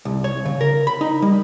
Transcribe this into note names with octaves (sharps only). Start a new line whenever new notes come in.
C2
C#5
C#3
A#4
B5
D#4
G3